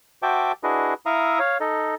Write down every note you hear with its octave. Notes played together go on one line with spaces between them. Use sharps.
F#4 C5 E5 G5 A5 D6
D4 E4 F#4 G#4 B4 D#5
E4 E5 F5 A#5 D#6
C#5 F5
D#4 A4 D#5